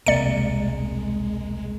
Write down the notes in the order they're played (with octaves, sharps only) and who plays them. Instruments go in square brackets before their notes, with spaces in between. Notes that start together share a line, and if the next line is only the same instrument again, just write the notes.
[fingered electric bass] E1 C2 C3 [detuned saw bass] G#3 [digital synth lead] A#3 [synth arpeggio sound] D5 C#7